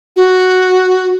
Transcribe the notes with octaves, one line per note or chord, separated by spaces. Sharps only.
F#4